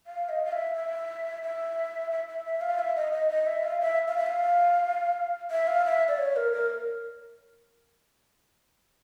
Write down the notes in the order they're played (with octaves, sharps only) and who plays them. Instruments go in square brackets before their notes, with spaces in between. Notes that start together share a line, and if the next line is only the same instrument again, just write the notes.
[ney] F5
D#5
F5
E5
E5
E5
E5
E5
E5
F5
E5
D#5
D#5
D#5
E5
F5
E5
F5
E5
F5
E5
F5
E5
D5
C#5
A#4
A#4